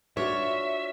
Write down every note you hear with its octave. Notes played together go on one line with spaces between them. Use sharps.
D4 F4 F#4 C#5 E5